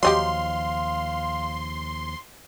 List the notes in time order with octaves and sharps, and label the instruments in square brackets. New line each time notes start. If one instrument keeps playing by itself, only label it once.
[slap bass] D#2 F3 [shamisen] F#3 D#4 G4 [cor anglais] F5 [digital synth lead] C6